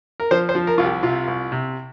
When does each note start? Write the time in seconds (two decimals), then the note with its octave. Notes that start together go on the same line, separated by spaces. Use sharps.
0.20 A#4
0.31 F3 C5
0.49 C5
0.55 F3
0.67 A#4
0.78 C2 F4
0.85 G4
1.03 C3 F4
1.28 C2
1.52 C3